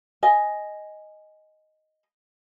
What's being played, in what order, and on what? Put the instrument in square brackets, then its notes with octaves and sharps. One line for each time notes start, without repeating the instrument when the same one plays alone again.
[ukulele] D#5 G#5